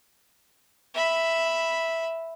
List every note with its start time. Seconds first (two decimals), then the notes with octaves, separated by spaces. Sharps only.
0.95 E5 B5